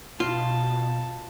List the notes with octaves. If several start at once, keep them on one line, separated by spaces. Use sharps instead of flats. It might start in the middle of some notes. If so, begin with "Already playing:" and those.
B2 F4 A5